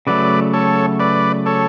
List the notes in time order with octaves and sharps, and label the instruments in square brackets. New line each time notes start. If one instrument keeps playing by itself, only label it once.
[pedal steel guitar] C#3 F#3 A3 [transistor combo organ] B4 D5
[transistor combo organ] A4 C#5
B4 D5
A4 C#5